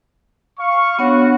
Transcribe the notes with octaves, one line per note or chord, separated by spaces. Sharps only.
F5 C#6
B3 D4 F#4 C#5